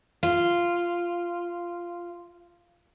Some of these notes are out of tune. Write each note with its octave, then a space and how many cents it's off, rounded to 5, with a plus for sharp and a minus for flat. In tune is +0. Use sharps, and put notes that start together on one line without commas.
F4 -10